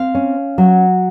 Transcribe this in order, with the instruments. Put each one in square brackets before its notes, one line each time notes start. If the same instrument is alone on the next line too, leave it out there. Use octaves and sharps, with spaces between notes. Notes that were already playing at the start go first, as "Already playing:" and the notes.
Already playing: [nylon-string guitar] C4 F5
C#4
F#3